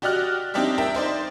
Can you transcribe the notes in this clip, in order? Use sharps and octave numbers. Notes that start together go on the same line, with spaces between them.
F#4 G4 D5 D#5 F6 F#6
C4 D4 D#4 G4 D5 E5
A#4 E5 G5
D#4 C5 D5